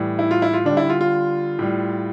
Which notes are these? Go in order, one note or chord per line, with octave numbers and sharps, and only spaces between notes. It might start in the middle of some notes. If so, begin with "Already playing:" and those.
Already playing: A2 E3 G3
E4
F4
E4
F4
D3 G3 D4
E4
F4
F4
A2 G3